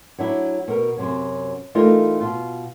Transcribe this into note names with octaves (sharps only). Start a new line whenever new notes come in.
F#3 D4 E4
B2 A#4
F#2 C3 F#3
E3 A3 D#4 F4 G4 A#4
B2 F4